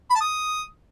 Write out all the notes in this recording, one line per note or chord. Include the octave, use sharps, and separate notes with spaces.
B5
A5
D#6